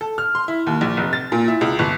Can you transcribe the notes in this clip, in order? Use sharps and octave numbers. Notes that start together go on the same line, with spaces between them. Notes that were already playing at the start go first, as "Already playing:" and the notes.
A4
F6
C6
E4
D#2
A#1
F1
A6
A#2
E4
C#2
G1